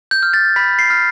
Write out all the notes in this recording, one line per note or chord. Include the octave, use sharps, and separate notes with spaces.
G6
F6
A6
B5 B6
C7
F6